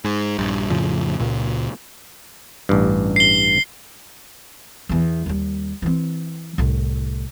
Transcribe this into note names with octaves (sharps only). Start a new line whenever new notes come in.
G#2
A#1 G2
F2 A2 C#3 F3
C#2 A#2
A1 G2
C7 G7
E2 E3
D#2 G3
E3 C4
C2 A2